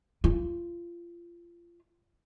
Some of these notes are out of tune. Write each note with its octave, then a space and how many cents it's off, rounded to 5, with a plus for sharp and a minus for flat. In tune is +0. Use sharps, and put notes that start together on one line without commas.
F4 -25